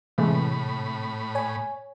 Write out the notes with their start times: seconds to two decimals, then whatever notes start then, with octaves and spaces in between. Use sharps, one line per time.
0.18 A2 C3 E3 G#3 A3 B5
1.35 C#5 G#5